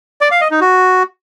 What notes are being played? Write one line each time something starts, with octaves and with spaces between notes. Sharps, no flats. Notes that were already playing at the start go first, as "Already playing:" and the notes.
D5
F5
D#5
D#4
F#4